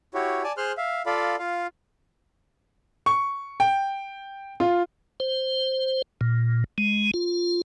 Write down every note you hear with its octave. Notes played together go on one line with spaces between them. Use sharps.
E4 F#4 G4 C#5
D5 G#5 A5
G#4 C5 C6 F6 F#6
E5 F5
F4 A4 D5 F5 B5
F4 F5
C#6
G5
F4
C5
A#2
G#3
F4